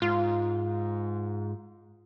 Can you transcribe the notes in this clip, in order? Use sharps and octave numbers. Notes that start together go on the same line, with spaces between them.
G#2 F4